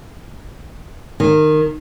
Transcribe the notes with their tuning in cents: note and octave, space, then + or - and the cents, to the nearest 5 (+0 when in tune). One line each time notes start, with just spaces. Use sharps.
D#3 -15